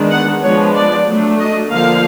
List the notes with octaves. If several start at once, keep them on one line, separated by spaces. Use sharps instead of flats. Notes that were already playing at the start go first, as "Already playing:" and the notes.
Already playing: D#3 G#3 B3 D4
F#5
F3 G#3 B3 D4 C#5
D5
F#3 A3 D4
D#5
D3 F3 A#3 F5